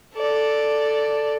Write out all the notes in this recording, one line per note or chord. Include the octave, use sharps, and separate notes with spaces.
A4 D5